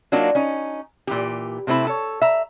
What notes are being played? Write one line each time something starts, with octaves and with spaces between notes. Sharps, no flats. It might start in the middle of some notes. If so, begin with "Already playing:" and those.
F#3 A#3 D4 D#4 F4
C#4 D#4
A#2 E3 G4
C3 A3 C4 E4
A4 C#5
E5 A#5